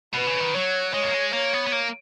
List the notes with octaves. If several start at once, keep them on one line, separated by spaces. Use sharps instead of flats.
B2 B4
C#3
D#3
F#3 C#5
G#3 C#5
A#3
G#3
A#3 C#5
B3
B3
A#3